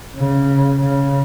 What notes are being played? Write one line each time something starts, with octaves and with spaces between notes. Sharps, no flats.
C#3
C#3